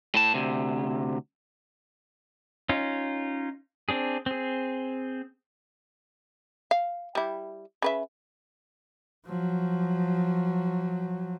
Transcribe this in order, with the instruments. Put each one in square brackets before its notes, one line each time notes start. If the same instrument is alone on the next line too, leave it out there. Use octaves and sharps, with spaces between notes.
[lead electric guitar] A2 A5
D2 C3
[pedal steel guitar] C#4 D#4 F4
C4 D4 G#4
C4 G#4
[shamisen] F5
G3 E4
C#3 B4 E5
[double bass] F3 F#3